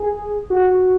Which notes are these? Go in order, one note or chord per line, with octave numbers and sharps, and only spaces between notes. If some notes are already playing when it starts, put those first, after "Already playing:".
Already playing: G#4
F#4